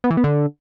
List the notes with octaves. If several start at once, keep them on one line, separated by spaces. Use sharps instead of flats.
B3
E3
B3
D3